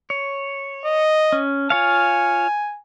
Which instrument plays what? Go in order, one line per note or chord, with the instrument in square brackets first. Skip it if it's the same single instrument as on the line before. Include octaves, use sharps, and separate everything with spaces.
[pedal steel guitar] C#5
[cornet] D#5
[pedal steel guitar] C#4
[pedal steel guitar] F4 C#5 F5 [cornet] G#5